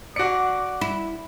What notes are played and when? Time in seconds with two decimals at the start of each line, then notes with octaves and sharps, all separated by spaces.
0.16 F#4 D5 F#5 D6 C#7
0.81 E4